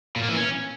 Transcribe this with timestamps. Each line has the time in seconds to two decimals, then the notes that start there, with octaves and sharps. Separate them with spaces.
0.16 A#2
0.22 A#3
0.29 E3
0.35 C#4